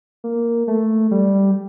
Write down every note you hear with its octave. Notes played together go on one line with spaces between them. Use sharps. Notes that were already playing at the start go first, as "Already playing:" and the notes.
A#3
A3
G3